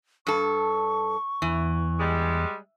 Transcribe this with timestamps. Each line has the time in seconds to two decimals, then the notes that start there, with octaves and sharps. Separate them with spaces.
0.27 G2 A4 C#6
1.42 E2 E3
1.98 G3 G#3